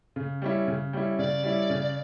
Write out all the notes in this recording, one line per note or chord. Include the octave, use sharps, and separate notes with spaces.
C#3
G3 C#4 E4
C#3
G3 C#4 E4
C#3 D5
G3 C#4 E4
C#3